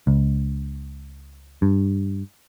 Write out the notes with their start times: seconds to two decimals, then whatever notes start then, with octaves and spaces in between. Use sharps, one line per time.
0.07 C#2
1.62 G2